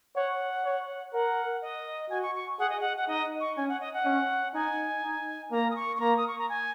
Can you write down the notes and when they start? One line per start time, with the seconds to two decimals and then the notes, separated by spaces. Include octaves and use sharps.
0.15 C#5 F#5
0.64 C#5
1.13 A#4 F#5
1.62 D#5
2.10 F#4 G#5
2.23 C#6
2.35 C#6
2.59 G#4 F#5
2.70 D#5
2.80 F#5
2.97 F#5
3.08 D#4 D#5
3.40 C#6
3.56 C#4 G#5
3.69 F#5
3.81 D#5
3.94 F#5
4.05 C#4
4.54 D#4 G#5
5.03 D#4
5.51 A#3 A#5
5.71 D#6
5.76 C#6
5.96 C#6
6.00 A#3 A#5
6.17 D#6
6.28 C#6
6.38 A#5
6.49 G#5